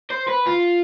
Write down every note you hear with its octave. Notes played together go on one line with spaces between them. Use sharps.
C5
B4
F4